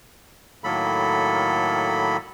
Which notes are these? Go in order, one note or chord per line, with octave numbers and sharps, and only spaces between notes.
A2 D#3 F#3 A#3 A4 B5